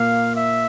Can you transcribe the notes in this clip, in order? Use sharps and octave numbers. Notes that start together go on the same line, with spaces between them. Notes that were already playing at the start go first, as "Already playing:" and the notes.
Already playing: A#2 A#3 F5
E5